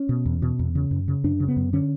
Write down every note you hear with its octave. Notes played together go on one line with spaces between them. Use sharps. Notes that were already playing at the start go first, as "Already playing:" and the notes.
Already playing: C#4
B2
E2
B2
E2
C#3
F#2
C#3
F#2 D4
C#3
B3
F#2
D3 C#4